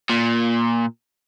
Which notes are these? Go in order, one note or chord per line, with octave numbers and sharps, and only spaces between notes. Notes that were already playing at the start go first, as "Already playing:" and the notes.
A#2